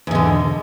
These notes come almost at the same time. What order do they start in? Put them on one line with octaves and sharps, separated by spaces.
E2 B2 D3